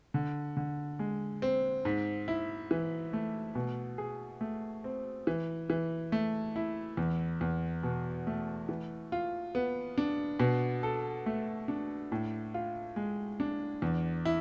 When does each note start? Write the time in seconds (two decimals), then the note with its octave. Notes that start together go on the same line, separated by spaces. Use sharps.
0.14 D3
0.57 D3
0.99 G#3
1.42 C4
1.85 G#2
2.28 E4
2.71 E3
3.13 A3
3.55 B2
3.98 G#4
4.41 A3
4.84 C4
5.27 E3
5.70 E3
6.12 A3
6.56 E4
6.97 E2
7.41 E2
7.83 B2
8.27 A3
8.69 E3
9.12 F4
9.55 B3
9.98 D4
10.40 B2
10.83 A4
11.26 A3
11.68 D4
12.12 A2
12.54 F4
12.96 G#3
13.40 D4
13.82 E2
14.25 E4